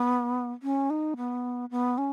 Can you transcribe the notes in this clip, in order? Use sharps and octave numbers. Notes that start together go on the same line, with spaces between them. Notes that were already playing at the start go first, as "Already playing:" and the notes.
Already playing: B3
C#4
D#4
B3
B3
C#4